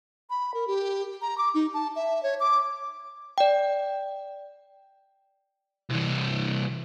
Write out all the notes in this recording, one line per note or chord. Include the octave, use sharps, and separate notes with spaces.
B5
A#4
G4
A#5
D6
D#4
A5
E5
C#5
D6
D5 G5
C2 E3